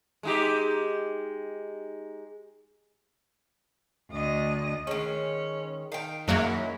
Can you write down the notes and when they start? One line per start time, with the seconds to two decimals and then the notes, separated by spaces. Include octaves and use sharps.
0.23 G#3 D#4 G4
4.11 D2 D#5
4.87 D#3 G#3 C#4
5.92 D#3 F5 G5
6.28 F#2 F#3 G#3 A#3 C#4 E4